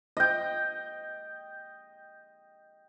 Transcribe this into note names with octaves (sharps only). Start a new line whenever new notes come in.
D#5 G5